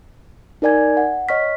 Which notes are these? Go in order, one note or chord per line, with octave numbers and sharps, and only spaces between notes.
D#4 A#4 D5 G#5 G#6
F#5
C#5 D#5 C#6 F6 B6